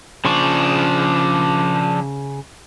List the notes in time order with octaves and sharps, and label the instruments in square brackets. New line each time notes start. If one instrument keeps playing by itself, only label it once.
[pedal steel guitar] C#3 C6 C#6 [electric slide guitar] F3 D4